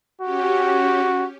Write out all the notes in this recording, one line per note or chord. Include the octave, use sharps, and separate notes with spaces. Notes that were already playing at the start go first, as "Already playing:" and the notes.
C#4 F#4 G4